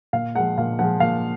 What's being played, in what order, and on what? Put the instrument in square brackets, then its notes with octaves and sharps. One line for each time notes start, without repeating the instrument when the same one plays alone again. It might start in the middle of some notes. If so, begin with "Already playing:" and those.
[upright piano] A#2 F5
F3 G#3 F#5
A#2 F5
F3 G#3 F#5
A#2 F5